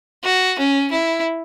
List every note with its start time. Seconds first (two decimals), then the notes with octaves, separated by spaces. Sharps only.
0.24 F#4
0.59 C#4
0.91 E4